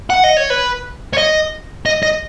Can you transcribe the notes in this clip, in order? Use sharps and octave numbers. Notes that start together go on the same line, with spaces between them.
F#5
D#5
C#5
B4
C#5
D#5
D#5
D#5